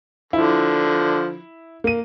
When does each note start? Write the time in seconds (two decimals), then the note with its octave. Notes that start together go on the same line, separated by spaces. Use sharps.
0.33 D3 F3 E4
1.84 A#3 D#7